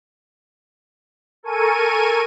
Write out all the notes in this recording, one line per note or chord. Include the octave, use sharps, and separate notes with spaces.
A4 A#4 G#5 C#6 D#7